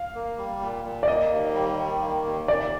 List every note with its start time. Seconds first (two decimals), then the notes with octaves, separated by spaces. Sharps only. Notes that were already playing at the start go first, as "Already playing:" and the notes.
Already playing: F5
0.15 A#3
0.38 G3
0.61 A#2
0.84 A#2
1.03 D5
1.08 A#3 D#5
1.31 D#2
1.54 G3
1.79 D#3
2.02 A#3
2.25 D#2
2.48 A#2 D5